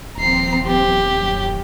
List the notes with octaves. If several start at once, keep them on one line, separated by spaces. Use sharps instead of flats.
D#1 F3 C4 A#5 C7
G4
F#2